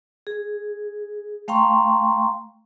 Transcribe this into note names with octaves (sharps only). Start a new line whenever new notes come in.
G#4
A3 F5 G5 A#5 C6 C#6